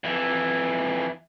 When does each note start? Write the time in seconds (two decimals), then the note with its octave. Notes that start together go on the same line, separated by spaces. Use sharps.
0.04 F2 E3